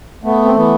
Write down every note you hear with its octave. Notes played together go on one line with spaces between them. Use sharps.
A3 B3
C4
E3 B3